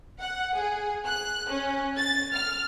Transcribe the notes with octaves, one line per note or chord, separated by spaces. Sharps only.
F#5
G#4
F#6
C#4
A6
F6